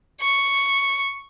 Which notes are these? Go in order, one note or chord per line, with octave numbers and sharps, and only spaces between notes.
C#6